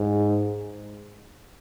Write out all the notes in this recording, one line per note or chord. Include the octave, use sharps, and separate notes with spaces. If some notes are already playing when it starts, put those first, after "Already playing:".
Already playing: G#2